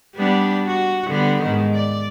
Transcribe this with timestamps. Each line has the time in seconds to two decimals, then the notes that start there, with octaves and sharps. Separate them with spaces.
0.15 G3 B3 D4
0.66 F#4
1.08 D3 G3 B3
1.43 G#2 D#3
1.74 D5